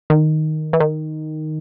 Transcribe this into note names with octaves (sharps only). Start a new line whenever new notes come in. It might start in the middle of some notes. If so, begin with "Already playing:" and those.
D#3
E3
D#3